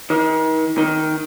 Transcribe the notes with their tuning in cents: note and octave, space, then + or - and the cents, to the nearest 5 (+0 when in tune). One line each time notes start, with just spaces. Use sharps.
D#3 +35
D#3 +5